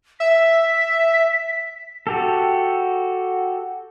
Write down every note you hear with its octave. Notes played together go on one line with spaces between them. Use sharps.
E5 B6
F#4 G4 A4